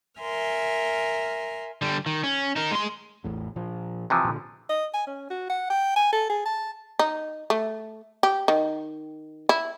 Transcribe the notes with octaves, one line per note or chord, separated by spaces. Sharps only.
A#4 E5 G#5 C6 F6
D3 G3
D#3
C#4
D#4 A#4
G#3 C6
A1 E2 A2
A#2 F3
C3 E3 F3
A#2 D3
D#5
G#5
C#4
F#4
F#5
G5
G#5
A4
G#4
A5
D#4
A3
G4
D#3
E4